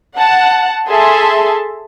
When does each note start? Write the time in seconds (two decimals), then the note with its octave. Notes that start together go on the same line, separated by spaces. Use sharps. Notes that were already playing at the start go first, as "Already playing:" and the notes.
0.16 F#5 A5
0.89 G#4 A4 E5 A5 C6